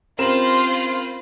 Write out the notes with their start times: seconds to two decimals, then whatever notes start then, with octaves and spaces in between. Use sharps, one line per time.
0.19 C4 C#4 F4 A#4 C5 B5 E7 F#7